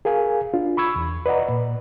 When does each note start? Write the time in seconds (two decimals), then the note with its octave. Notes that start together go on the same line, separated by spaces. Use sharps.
0.05 G#4 A#4 F5 G#5
0.54 D4 F4
0.77 B5 C#6 E6 G#6
0.96 E2
1.26 B4 D5 D#5 F#5 A#5
1.49 A#2